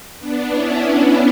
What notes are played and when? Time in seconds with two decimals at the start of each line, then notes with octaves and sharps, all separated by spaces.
0.19 B3 D4
0.50 C#4 E4
0.81 C#4 E4